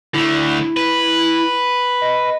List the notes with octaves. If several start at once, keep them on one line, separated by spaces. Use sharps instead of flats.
D3 A3 E4
B4
D#5